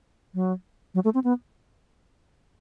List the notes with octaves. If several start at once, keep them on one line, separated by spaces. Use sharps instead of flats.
F#3
F#3
A3
C4
B3